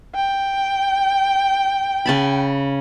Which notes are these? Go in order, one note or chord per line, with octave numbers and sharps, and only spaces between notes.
G5
C#3 A5 B5